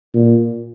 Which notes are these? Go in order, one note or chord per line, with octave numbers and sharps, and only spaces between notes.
A#2